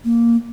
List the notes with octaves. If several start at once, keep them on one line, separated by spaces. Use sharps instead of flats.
A#3